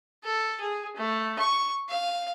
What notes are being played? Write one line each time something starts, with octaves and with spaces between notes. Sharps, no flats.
A4
G#4
A3
C#6
F5